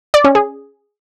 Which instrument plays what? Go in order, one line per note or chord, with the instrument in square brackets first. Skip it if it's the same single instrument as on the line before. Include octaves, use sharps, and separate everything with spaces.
[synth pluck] D5
C#4
G#4